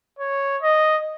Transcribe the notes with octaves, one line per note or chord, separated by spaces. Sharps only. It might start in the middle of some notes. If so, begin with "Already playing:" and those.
C#5
D#5